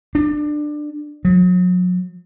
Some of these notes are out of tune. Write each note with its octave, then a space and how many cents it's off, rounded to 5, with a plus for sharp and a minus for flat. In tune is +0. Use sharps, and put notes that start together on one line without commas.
D4 +20
F#3 -40